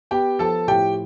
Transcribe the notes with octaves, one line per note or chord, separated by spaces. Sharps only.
B3 G4 G5
F3 A4 A5
A2 G4 G5